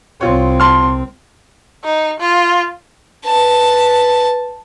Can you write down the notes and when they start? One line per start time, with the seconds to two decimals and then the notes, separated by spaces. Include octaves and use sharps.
0.21 C2 C4 F4 C#5
0.60 A5 C6 F6
1.84 D#4
2.20 F4
3.26 B4 A5